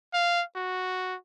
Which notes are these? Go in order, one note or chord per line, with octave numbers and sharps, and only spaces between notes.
F5
F#4